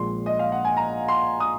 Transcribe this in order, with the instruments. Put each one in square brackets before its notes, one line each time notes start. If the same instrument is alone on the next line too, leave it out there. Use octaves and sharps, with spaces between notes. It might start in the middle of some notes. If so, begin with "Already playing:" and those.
Already playing: [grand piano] A#1 A#2 F3 G#3 C6
D#5
F5
F#5
G#5
A#5
C6
D#6